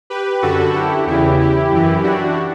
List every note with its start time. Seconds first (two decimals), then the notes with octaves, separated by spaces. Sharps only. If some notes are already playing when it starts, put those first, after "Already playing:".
0.10 G4 B4
0.42 F#2 D3 F#4 A4
0.75 E4 G4
1.07 E2 C#3 E3 E4 G4
1.39 E4 G4
1.71 F#2 E3
2.04 D4 F#4